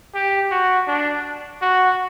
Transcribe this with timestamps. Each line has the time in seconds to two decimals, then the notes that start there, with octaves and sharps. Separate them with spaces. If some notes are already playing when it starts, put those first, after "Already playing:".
0.15 G4
0.51 F#4
0.87 D4
1.62 F#4